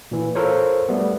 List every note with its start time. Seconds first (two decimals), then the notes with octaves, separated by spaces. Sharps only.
0.11 A#2 E3
0.35 F4 A4 A#4 C5 C#5
0.89 G3 A3 B3